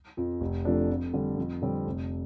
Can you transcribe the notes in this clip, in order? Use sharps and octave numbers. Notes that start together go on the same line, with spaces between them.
F2 F3
F1
F2 F3 A3 D4
F2
D3 G3
F2
D3 G3 C4
F1